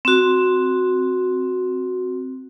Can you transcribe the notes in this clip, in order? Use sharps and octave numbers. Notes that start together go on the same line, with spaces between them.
C4 F#4